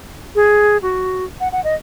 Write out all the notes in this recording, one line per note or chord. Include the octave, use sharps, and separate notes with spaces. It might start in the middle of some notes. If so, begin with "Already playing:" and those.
G#4
F#4
F#5
F#5
D#5